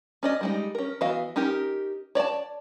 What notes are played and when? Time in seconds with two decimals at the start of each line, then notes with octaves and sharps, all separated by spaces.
0.23 C#4 D5 D#5
0.41 G3 G#3 D#4
0.75 C#4 A#4
1.01 E3 B3 F#4 D#5 F5
1.36 C#4 D#4 G4 A#4
2.15 C#5 D5 F#5 A5